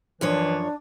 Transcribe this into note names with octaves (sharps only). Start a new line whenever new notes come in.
F#2 E3 F3 D4 C#5